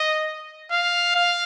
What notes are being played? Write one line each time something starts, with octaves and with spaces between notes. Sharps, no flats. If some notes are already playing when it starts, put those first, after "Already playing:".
Already playing: D#5
F5
F5